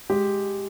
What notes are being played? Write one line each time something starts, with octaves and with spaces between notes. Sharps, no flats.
G#3 G4